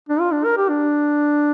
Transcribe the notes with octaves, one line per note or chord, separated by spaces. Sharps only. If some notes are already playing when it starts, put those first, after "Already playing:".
D4
F4
D4
A#4
G4
D4